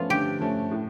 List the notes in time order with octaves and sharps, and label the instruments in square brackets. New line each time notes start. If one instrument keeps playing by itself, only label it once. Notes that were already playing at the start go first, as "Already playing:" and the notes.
Already playing: [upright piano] F3 A3 C#4 [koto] B3 F4
[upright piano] D3 [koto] G4
[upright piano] F3 A3 C#4
A2